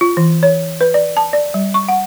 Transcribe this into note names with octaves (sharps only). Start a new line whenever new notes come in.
F4
E3
C#5
B4
D5
A5
D5
G3
C#6
F#5